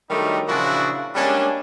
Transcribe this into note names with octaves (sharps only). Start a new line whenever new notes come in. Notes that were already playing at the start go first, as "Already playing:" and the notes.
D#3 F#3 G3 A3 D4 D#4
A#2 C#3 F3 D4 E4 F#4
G3 G#3 A#3 C#4 D4